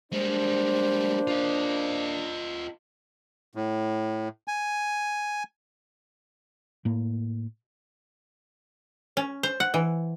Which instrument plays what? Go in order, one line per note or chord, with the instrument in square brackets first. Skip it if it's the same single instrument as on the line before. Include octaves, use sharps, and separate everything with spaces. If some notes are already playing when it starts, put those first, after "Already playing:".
[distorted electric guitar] G3 G#3 [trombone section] A#3 D4 [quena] C5
[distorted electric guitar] F4 D#5
[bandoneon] A2
G#5
[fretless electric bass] A2 A#3
[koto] C#4
C5
F#5
E3